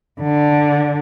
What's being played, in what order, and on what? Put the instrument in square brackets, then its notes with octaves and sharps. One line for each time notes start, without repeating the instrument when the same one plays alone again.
[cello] D3